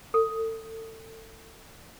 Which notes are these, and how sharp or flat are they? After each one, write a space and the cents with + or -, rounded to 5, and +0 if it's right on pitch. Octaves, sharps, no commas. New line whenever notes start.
A4 +30